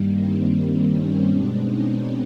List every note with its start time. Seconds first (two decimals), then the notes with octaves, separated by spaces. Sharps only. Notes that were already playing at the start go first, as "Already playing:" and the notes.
Already playing: G2 D#3 G3 A#3
0.17 C4
0.54 C4
0.92 C#4
1.28 B2 G#3 B3 C4 D4
1.66 C#4 D#4